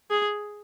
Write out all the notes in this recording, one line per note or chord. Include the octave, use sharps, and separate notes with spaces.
G#4